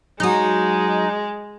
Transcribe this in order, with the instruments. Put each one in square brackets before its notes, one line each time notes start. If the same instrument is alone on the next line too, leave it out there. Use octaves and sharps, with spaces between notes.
[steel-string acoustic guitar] F#3 F#4 [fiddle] G#3 [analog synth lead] D#4